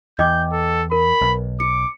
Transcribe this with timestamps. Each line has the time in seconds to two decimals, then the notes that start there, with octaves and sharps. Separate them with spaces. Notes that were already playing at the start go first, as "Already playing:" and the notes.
0.19 E2 D#5 G5 D6 G6
0.52 A4
0.92 A#4 B5
1.21 B1
1.60 D6 C#7